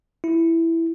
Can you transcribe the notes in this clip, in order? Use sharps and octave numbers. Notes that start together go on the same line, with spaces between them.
E4